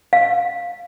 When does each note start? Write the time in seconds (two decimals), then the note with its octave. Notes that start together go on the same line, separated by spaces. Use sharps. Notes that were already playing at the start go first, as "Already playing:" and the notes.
0.13 F5